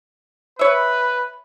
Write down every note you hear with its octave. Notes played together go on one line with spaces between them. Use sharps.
B4 C#5 E5